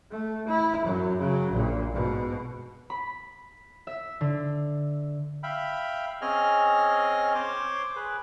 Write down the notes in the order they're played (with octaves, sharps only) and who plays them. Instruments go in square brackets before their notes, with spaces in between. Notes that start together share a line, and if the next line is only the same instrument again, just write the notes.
[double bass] A3
E4
F#2 F#3
C#3 F#3
A#1 A#2
G#2 B2
[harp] B5
E5
D3
[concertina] E5 F5 G5 B5
C4 C#4 G#4 C#5 D#5 F6
C5 C#5 C6 D6
G#4 B4